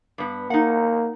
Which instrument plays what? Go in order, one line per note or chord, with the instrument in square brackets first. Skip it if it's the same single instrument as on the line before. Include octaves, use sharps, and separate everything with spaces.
[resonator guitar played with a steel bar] G2 B3
[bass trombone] A#3 [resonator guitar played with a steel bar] D#4 F#5